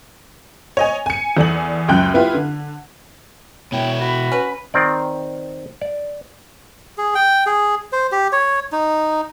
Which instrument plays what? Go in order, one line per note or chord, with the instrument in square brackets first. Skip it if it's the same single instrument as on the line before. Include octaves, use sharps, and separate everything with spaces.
[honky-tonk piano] C#5 D#5 G#5
G#5 C#7
E2 A4 D5 G#5 F#7
C#2 F#2 G5 F#6
B3 E4 F4 G4
D3
[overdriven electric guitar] B2 E4 [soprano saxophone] C#5 [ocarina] G5
[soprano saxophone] F#4 [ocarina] B5
[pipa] C#4 B4
[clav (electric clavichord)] D#3 C4 D5
D5
[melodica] G#4
G5
G#4
C5
G4
C#5
D#4